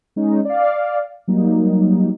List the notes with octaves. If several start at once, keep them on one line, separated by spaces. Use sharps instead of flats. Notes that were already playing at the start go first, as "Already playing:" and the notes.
G#3 C#4 D#4
D5 F5
F#3 G3 A#3 D#4